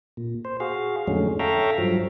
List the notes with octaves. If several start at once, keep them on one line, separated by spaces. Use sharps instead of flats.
A#2
C5
F#4 G#4 F5
F2 A2 D3 F#3 G#3 C#4
A4 C#5 E5 F5 G5 A#5
G2 F3 F#3